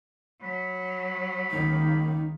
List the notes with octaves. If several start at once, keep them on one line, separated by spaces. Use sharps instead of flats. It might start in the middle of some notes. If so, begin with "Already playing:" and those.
F#3 B5
C#2 D#3 A#3 D#4